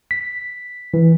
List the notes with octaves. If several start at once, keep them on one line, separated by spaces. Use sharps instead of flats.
B6
E3